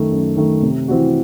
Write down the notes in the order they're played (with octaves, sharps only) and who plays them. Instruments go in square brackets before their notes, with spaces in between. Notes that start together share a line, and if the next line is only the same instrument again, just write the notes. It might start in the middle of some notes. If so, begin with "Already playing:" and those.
Already playing: [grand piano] F#2 D#3 A3
F#2
D#3 A3
C3
E3 C4 F#4